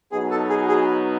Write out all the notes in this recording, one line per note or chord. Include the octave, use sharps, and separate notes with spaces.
B2 F#3 B3 D#4 F#4 G#4
A4
G#4
G#4